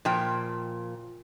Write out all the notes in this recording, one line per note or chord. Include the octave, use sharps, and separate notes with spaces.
A#2 F3 G5